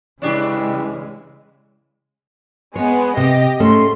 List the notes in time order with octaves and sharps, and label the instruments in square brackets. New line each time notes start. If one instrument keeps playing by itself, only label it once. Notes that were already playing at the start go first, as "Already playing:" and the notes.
[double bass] C#3 G#3 [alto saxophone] E3 [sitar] C#4 D4 G4
[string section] G#3 B3 [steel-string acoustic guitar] C#5
[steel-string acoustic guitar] C3 [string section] G4 D#5
[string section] G#2 C6 [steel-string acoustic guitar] A3 C#4